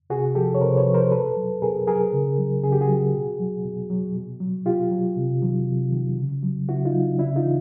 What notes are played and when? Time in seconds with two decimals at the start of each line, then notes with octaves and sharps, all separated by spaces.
0.10 C3 F#4 G#4
0.35 F3 G4 A4
0.55 C#5
0.60 C3 A#4 C5
0.77 B4 C#5
0.86 F3
0.94 A#4 C5
1.11 B2 A4 B4
1.37 F#3
1.62 B2 G#4 A#4
1.87 F#3 G#4 A#4
2.13 C#3
2.38 F#3
2.64 C#3 G#4
2.72 G4
2.81 F#4 G#4
2.89 F#3
3.14 B2
3.40 F#3
3.65 B2
3.90 F#3
4.15 B2
4.40 F#3
4.66 B2 F4 G4
4.91 F#3
5.17 C3
5.42 D#3 F#3
5.67 C3
5.93 D#3 F#3
6.18 C#3
6.43 F#3
6.69 C#3 E4 F#4
6.85 D#4 F4
6.94 F#3
7.19 C#3 D4 E4
7.36 D#4 F4
7.45 E3